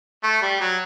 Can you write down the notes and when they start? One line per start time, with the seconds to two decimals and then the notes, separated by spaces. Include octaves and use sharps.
0.23 A3
0.42 G3
0.60 F#3